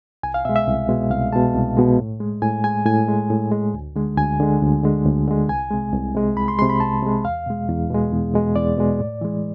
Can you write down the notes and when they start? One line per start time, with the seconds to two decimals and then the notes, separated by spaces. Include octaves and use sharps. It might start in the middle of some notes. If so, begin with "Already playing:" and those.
0.23 C2 G#5
0.34 F5
0.45 B2 G#3 E5
0.56 E5
0.67 C2
0.89 B2 G#3
1.11 C2 F5
1.32 B2 G#3 A5
1.55 C2
1.77 B2 G#3
1.98 A2
2.20 G#3
2.42 A2 G#5
2.64 G#3 G#5
2.86 A2 G#5
3.08 G#3
3.30 A2
3.52 G#3
3.74 D2
3.96 D3 G#3
4.17 D2 G#5
4.40 D3 G#3
4.61 D2
4.83 D3 G#3
5.05 D2
5.27 D3 G#3
5.48 C2 G#5
5.71 C3 G#3
5.93 C2
6.15 C3 G#3
6.37 C2 B5
6.48 C6
6.59 G#3 C6
6.62 C3
6.69 B5
6.80 C2 A5
7.02 C3 G#3
7.24 E2 F5
7.46 B2 G#3
7.68 E2
7.90 B2 G#3
8.12 E2
8.34 B2 G#3
8.56 E2 D5
8.78 B2 G#3
9.00 A2
9.21 E3 G#3